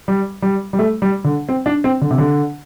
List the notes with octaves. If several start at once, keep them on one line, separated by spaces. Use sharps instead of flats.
G3
G3
G3
A3
G3
D3
C4
D4
C4
D3
C3
D3